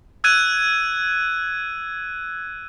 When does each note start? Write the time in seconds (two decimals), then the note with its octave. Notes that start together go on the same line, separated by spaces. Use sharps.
0.24 E6 F#6 G#6 D#7